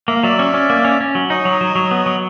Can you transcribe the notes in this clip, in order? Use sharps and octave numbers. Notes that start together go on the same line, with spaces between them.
A#3 E5
F5
F#3 D5 E5
C#4
C#4
A#3
C#4
C#4
F#3
D#4 C#5 D#5
F#3
F#3
F#3
B3
F#3